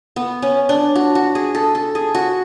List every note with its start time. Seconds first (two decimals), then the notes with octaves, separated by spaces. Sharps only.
0.16 B3
0.42 C#4
0.69 D4
0.95 F#4
1.15 F#4
1.35 G#4
1.55 A4
1.75 A4
1.95 G#4
2.15 F#4